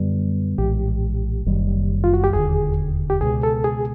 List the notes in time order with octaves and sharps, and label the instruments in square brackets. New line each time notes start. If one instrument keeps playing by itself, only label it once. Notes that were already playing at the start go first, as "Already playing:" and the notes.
Already playing: [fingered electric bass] F#2 D3 G3 B3
[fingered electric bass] A#1 A2 E3 G#3 [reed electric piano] G4
[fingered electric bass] F#1 F#2 D#3 G3
[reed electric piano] F4
F#4
G4
[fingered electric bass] E1 D#2 D3 [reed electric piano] G#4
[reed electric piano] G4
[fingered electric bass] C#2 B2 G#3 B3 [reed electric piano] G#4
[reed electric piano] A4
G#4